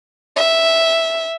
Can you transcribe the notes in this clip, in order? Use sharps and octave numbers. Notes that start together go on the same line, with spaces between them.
E5